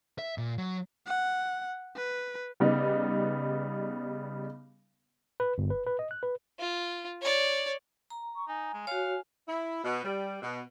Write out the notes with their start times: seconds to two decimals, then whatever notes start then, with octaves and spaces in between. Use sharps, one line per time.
0.19 E5
0.38 A#2
0.58 F#3
1.06 F#5
1.96 B4
2.60 C#3 G3 B3 D#4
5.40 B4
5.58 G1
5.70 B4
5.87 B4
5.99 D#5
6.11 F#6
6.23 B4
6.59 F4
7.21 C#5 D5
8.10 A#5
8.35 C#6
8.48 D#4 G#5
8.74 G#3
8.87 F#4 C#5 F5
9.47 E4
9.83 B2
10.03 G3
10.42 B2